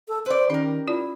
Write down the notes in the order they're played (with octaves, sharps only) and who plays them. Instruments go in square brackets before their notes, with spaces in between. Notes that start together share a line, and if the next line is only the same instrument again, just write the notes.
[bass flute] A4
[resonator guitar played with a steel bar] B4 D5 [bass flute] C5
[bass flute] D#3 [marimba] C#4 [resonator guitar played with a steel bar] G4 A#4
[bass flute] E4 [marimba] F4 D5